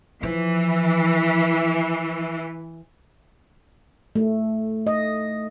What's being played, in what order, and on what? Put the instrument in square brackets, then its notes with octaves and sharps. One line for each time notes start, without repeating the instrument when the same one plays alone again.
[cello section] E3 [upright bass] F3
[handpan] A3
D#5